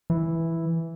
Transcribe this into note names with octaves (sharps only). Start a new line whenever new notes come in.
E3